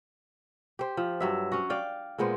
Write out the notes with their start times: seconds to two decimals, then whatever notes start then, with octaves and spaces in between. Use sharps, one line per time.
0.79 G4 C5
0.97 F3
1.20 G2 F#3 E5
1.52 C#4 F#4
1.70 D5 F5 G5
2.18 A#2 G#3 B3 C5